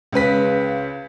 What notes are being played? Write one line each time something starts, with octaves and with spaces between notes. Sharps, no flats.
C#2 C#3 B4 B6